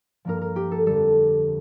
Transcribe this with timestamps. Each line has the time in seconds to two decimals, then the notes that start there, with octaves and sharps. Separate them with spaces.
0.25 G2 F3 A#3 A#4
0.41 A#4
0.56 G4
0.71 A4
0.86 F2 D3 G3 A4